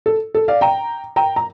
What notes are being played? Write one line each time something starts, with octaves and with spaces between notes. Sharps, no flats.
A4
A4
D5 F5
G5 A#5
G5 A#5
A#5